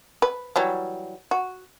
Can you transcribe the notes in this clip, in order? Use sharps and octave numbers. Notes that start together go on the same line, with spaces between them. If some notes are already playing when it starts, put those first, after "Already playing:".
B4
E3 F#3 G3
F#4